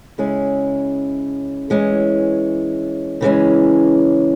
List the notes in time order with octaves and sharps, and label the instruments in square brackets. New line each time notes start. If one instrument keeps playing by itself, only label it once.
[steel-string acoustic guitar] C#3 G#3 C#4 E4
E3 G#3 C#4
C#3 E3 G#3 C#4